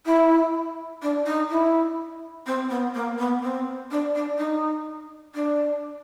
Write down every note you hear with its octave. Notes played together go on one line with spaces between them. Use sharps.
E4
D4
D#4
E4
C4
B3
A#3
B3
C4
D4
D4
D#4
D4